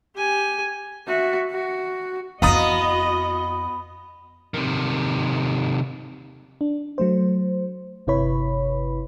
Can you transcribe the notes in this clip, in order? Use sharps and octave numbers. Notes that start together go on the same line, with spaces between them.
G4 G#5
F#4 E5
F#4
F2 B3 E4 F#4 D#5 F5 A#5 D#6
C3 D#3
D4
F#3 A3 C5
G1 C3 E4 B4 C#5 B5